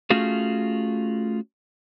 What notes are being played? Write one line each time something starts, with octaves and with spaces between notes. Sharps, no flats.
A3 C#4 F4 F#4 G#4